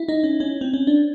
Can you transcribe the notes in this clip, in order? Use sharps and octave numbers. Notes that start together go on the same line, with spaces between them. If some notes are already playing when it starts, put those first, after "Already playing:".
Already playing: E4
D#4
C#4
C#4
C4
C#4
D4